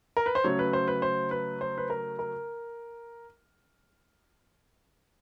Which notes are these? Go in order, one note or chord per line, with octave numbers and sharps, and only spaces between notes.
A#4
B4
C5
C#3 F#3 A3 C#5
B4
C5
B4
C5
B4
C5
B4
A#4
A#4